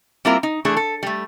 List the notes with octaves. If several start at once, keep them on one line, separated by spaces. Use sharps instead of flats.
G3 A#3 C4 E4 F4 A#4
D#4
E3 A3 D4 G#4
A4
G3 A3